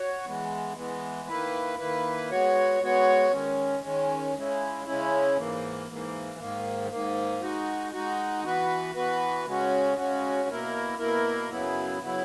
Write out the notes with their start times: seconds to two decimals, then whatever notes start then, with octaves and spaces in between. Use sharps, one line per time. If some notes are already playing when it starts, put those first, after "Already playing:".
Already playing: F#4 C#5
0.26 E3 G#3 B3
0.77 E3 G#3 B3
1.29 D#3 A#3 E4 B4
1.79 D#3 A#3 E4 B4
2.31 G#3 B3 F#4 C#5
2.81 G#3 B3 F#4 C#5
3.32 D#3 G#3 C#4
3.83 D#3 G#3 C#4
4.34 C#3 G#3 C#4 E4
4.86 C#3 G#3 C#4 E4
5.37 G#2 E3 A#3
5.88 G#2 E3 A#3
6.39 G#2 D#3 A#3
6.90 G#2 D#3 A#3
7.41 G#3 D#4 F#4
7.93 G#3 D#4 F#4
8.44 E3 B3 F#4 B4
8.95 E3 B3 F#4 B4
9.45 C#3 G#3 C#4 F#4
9.97 C#3 G#3 C#4 F#4
10.49 B2 A#3 E4 A#4
10.99 B2 A#3 E4 A#4
11.50 F#2 C#3 F#3 B3 E4
12.02 C#3 F#3 B3 E4